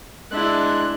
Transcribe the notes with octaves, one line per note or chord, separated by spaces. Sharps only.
G#3 D4 E4 F#6